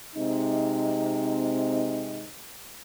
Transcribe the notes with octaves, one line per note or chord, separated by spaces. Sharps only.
C3 G#3 C4 D#4